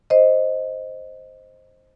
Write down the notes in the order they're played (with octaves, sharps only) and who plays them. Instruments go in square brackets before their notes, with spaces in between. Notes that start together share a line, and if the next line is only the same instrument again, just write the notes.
[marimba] C5 D#5